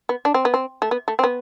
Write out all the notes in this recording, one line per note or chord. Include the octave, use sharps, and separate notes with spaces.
B3
D4
C4
B3
C4
A3
B3
A3
C4
B3